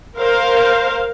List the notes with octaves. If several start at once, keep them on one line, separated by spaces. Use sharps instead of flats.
A#4 C5 F5